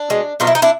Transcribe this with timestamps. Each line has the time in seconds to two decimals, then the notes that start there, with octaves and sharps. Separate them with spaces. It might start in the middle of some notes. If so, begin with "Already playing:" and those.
Already playing: D4
0.10 B2 G#3
0.40 B2 F#3 A3 F4
0.47 E4
0.55 D#4
0.62 D4 E4